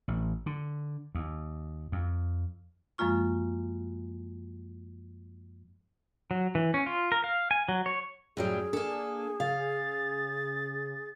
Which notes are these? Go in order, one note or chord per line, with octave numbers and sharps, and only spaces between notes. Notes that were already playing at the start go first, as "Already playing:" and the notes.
A1
D3
D#2
F2
F#2 F3 G#3 A#3 F4 C#6
F#3
E3
C#4
F4
A#4
F5
G#5
F#3
C#5
F#2 A2 F#3 G3 G#4 G5
A#3 D4 A4 G#5
C#3 F5 A6